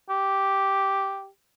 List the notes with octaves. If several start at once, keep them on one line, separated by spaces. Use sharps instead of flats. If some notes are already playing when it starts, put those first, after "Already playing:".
G4